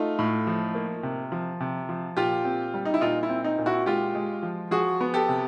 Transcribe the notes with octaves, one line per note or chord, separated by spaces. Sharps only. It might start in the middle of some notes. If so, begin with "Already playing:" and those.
Already playing: A3 D#4 F4
A2
F3
A#3
C3
F3
C3
F3
A#2 F4 G4
C4
G3
D#4
E4
A#2 D#4 F4
E4
C4
D#4
A#2
E4 F#4
G#3 F4 G4
G#3
F3
F3 F#4 G#4
B3
G4 A4
C3